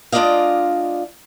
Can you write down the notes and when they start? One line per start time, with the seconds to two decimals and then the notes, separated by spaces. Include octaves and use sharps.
0.12 G#3 D4 F4 D5 D#5 F5